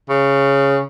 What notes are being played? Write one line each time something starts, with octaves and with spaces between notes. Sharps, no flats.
C#3